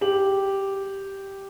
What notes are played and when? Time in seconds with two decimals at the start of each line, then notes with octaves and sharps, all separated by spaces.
0.01 G4 F#7